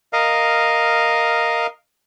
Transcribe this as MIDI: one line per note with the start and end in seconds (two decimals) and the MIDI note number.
0.13 1.67 70
0.13 1.67 75
0.13 1.67 77